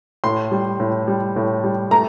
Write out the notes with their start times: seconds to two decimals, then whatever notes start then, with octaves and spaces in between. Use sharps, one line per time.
0.24 A2 C6
0.51 G3
0.80 A2
1.08 G3
1.36 A2
1.64 G3
1.91 A3 A#5